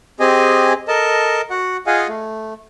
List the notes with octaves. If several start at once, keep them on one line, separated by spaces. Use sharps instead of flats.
C4 G4 G#4 D#5 G#5
A4 A#4 D#5 A5
F#4 F#5
F4 G#4 D#5 F5 F#5 G#5
A3